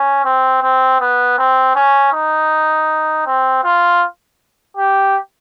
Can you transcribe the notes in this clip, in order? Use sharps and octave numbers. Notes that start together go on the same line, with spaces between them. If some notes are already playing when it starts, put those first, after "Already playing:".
Already playing: C#4
C4
C4
B3
C4
C#4
D#4
C4
F4
G4